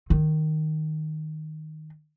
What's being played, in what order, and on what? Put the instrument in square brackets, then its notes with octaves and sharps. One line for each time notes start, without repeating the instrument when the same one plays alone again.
[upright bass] D#3